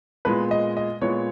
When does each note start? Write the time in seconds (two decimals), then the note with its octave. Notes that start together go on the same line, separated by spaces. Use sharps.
0.25 A#2 G#3 B3 B4
0.51 D#5
0.77 D#5
1.01 A#2 G#3 B3 C#5